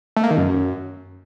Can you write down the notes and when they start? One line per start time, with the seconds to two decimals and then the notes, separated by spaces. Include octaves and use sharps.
0.16 A3
0.23 A#3
0.30 D#3
0.37 F#2